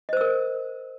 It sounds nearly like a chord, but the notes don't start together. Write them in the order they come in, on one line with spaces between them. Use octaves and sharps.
D#5 C5 E6 A#4